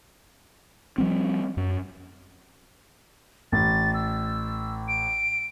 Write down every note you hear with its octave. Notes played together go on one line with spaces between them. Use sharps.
F3 G3 C4
F#2
A1 A6
E6
D7